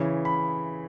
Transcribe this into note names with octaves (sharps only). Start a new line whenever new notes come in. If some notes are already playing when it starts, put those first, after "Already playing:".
Already playing: C#3 E3 C#5
B5